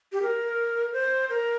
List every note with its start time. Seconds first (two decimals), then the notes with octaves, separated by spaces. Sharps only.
0.12 G4
0.22 A#4
0.93 C5
1.30 A#4